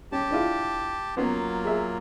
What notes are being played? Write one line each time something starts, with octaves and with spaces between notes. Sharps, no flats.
C#4 G4 A5
D4 E4 F4
F#3 A#3 B3 C#4 F4
G#4 E5